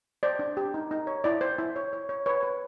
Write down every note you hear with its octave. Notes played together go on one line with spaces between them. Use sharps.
C5 D5
D4
G4
D#4
D#4
C#5
E4 D5
C5
E4
C#5
C#5
C#5
B4 C#5
B4